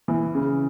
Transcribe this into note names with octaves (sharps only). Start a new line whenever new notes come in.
E3
C#3